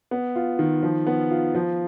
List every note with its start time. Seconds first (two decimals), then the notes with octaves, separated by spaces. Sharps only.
0.11 B3
0.36 F4
0.59 D#3
0.83 F3
1.06 B3
1.31 F4
1.55 F3